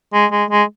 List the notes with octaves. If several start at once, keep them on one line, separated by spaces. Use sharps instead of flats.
G#3
G#3
G#3